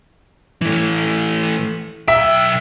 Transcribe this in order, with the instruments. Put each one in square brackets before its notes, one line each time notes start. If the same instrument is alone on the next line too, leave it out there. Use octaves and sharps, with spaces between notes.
[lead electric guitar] E3 A3
[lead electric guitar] B1 G5 [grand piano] E5